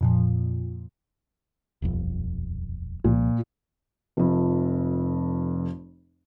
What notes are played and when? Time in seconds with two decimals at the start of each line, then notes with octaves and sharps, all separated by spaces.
0.01 F2 A#2 F3
1.82 D#1 B1 F2
3.04 C2 A#2 F3
4.17 F1 F2